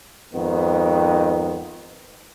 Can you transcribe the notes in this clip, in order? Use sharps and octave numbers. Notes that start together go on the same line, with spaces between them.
F2 G#2 D#3 B3